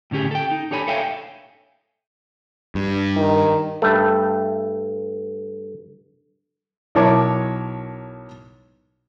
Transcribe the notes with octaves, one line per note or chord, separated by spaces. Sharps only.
A2 D3 C#4 G4 G#4
A4 G5
D#4
D4 G4 A4 C#5 G#5 B5
A4 C#5 E5 F5 G5 G#5
G2
D#3
G2 A3
B1 E4 A#4 C#5 A5 D6